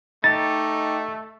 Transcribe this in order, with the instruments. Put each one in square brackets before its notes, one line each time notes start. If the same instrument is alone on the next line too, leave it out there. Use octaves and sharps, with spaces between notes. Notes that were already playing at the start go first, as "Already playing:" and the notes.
[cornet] A3 [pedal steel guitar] D#4 G4 [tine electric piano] A6